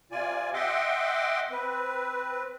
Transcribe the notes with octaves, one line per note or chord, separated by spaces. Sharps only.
C3 F4 D5 G#5
D#5 E5 F#5 G5 C6 D6
C4 B4